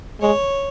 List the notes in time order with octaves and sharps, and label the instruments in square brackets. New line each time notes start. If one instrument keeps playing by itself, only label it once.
[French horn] G#3 [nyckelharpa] C#5